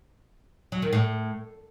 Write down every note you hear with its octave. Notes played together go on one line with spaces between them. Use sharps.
F#3
D#3
A2